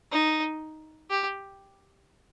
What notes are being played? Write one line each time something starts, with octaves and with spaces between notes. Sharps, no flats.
D#4
G4